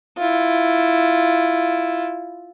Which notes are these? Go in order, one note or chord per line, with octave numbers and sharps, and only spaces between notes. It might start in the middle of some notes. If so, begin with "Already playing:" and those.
E4 F4